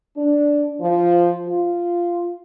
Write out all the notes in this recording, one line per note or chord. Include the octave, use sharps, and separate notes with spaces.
D4
F3
F4